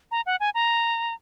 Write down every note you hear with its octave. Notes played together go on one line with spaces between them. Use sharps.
A#5
F#5
G#5
A#5